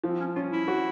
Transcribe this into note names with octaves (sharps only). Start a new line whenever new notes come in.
F3 C4
C#4
C#4 F4
E4
F#4